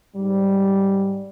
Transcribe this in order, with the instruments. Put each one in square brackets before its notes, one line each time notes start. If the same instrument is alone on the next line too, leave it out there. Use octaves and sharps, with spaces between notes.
[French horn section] G#2 G3